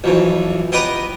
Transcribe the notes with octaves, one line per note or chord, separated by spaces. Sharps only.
B1 F2 E3
B3 G4 B4 D#5 A#5